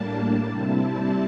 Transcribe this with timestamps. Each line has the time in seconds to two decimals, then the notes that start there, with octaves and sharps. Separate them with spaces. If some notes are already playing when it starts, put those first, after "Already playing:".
Already playing: A2 G3 A#3 D4 A5
0.51 C3 G3 C4 E4 A5